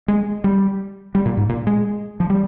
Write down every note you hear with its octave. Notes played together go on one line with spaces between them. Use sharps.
G#3
G3
G3
A#2
G#2
A#2
G#3
F3
G3